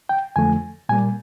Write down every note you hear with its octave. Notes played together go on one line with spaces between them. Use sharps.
G5
F2 D3 F3 A3 G#5
A#2 G3 A#3 G#5